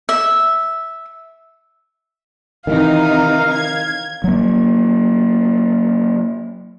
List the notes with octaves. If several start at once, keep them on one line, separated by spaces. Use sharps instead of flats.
E5
C3 D#3 E3 D#4 F5
G#6
F#3 A#3